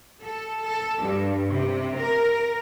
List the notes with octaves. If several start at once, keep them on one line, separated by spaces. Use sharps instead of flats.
A4
A4
G2
C3
A#4